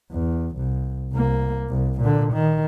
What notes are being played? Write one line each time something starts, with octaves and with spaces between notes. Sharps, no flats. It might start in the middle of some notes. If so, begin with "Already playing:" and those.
E2
C2
C2 A#3
C2
A#2 D3
D#3